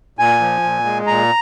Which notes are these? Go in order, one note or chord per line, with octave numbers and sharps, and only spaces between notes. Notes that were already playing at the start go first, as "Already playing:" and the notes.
A#2 G#5
F3
A#2
G#3
A#2 A#5